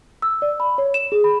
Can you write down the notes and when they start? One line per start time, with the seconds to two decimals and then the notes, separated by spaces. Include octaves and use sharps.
0.22 E6
0.42 D5
0.60 B5
0.78 C#5
0.94 E7
1.12 G#4
1.24 B5